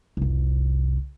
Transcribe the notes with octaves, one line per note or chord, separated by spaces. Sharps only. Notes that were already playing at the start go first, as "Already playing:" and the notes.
F1 C2